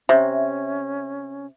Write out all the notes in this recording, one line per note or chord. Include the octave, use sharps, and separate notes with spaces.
C3 C#4 E5